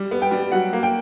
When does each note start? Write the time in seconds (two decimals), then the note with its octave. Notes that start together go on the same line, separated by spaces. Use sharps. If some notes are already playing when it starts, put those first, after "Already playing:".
Already playing: G3
0.11 B3
0.22 G5
0.31 G3
0.52 F#3 F#5
0.73 A#3
0.83 G5